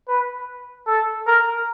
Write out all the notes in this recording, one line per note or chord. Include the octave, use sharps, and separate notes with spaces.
B4
A4
A#4